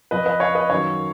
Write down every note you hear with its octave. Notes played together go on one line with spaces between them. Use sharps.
F2 F3 B4 D#5
B4 D#5
C#5 F5
B4 D#5
F#2 D#3 F#3 C#5 F5